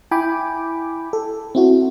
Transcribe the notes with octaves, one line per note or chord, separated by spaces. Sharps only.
E4 G5 G#5 B5 D6
A4
C4 E4 F#4